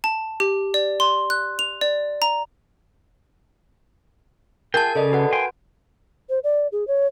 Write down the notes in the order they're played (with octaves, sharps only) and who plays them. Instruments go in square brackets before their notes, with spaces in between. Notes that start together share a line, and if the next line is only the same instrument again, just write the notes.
[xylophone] A5
G4
D5
C6
F#6
F7
D5
A#5
[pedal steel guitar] F4 G#4 G5 [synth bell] A#4 A5
[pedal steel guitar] C#3 [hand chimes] A4 D5 D#5
[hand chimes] F#4 B4 F#5
[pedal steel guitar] G5 G#5 C6
[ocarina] C5
D5
G#4
C#5